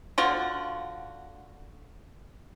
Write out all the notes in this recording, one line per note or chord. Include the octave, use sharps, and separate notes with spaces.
D3 F4 F#4